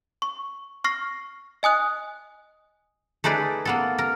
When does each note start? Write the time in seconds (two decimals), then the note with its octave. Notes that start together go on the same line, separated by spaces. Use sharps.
0.22 C#6
0.84 C#6 F6 A#6 C7
1.63 D#5 G#5 D#6 F#6
3.24 A3 D#4 G#4 B4 D5
3.65 A#3 B3 A4
3.98 A#4